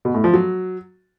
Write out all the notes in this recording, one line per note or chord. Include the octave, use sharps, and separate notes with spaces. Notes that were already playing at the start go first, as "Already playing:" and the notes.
B2
A2
F3
F#3